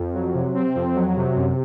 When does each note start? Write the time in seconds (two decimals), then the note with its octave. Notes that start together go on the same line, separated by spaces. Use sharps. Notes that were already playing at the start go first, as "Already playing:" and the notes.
Already playing: F2
0.14 F#3
0.34 C3
0.54 C4
0.75 F2
0.96 F#3
1.16 C3
1.36 F#2